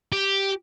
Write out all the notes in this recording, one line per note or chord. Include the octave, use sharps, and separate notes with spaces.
G4